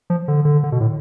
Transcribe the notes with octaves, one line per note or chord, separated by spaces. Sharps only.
F3
D3
D3
D3
B2
A2